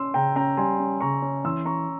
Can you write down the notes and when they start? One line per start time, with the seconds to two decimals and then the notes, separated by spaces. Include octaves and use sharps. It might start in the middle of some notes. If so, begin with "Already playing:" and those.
Already playing: C#4 C6 E6
0.14 C#3 G5 A#5
0.36 C#4 G5 A#5
0.57 G3 G#5 C6
0.79 C#4
1.01 C#3 A#5 C#6
1.22 C#4
1.44 E3 C6 E6
1.65 C#4 A#5 C#6